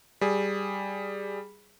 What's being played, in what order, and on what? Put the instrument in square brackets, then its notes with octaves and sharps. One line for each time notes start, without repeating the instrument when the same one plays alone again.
[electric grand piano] G3 G#4